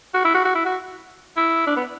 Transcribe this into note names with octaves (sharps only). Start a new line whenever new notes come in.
F#4
E4
F#4
F#4
E4
F#4
E4
D4
B3